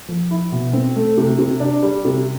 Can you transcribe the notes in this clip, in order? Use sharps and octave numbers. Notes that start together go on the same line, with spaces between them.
F3
E4
B2
C4
A3
C3
C3
D4
G3
C3